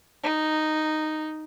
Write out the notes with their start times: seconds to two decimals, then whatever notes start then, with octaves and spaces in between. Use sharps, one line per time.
0.23 D#4